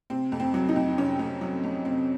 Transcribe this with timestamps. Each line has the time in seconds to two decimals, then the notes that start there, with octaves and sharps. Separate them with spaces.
0.10 C3 C4
0.32 F2
0.40 C4
0.54 F#3
0.69 D#4
0.76 F2
0.97 C3 C#4
1.19 F2
1.41 F#3
1.63 F2
1.85 C3 C4